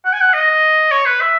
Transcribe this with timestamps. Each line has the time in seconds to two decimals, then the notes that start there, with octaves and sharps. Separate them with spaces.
0.05 F#5
0.13 G#5
0.21 F#5
0.34 D#5
0.91 C#5
1.06 B4
1.21 E5